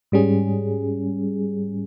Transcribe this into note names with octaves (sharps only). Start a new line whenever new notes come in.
G#2 G3 C#4 G#4